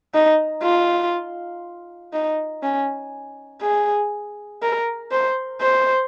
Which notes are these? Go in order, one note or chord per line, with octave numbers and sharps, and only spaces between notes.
D#4
F4
D#4
C#4
G#4
A#4
C5
C5